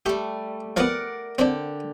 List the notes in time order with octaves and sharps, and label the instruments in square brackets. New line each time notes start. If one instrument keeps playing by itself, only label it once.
[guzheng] G3 A3 [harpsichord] G4
[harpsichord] F3 B3 [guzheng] A#4 D5 F#5
[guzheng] D3 G4 [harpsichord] C4 D4